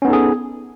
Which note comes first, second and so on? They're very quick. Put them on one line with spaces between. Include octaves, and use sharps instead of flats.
C#4 B3 D#4 A4 G#4